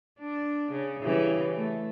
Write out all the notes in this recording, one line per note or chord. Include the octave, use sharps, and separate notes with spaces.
D4
C#3
C#3 E3 G3
A3